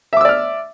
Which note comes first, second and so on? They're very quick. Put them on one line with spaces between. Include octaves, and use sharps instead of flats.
E5 D6 E6 D5 F6